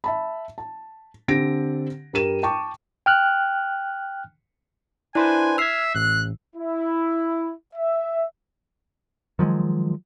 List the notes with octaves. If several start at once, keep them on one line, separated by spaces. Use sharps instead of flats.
E5 A5 B5
A5
D3 C4 G4 A#6 D7
G2 G3 A#4 D#7 E7
G5 A5 C#6 D6
G5 F6 F#6
D4 E4 B4 C5 G#5 C6
E5 E6 F6 G#6 C7
A1 F#6
E4
E5
D#3 F3 F#3 G#3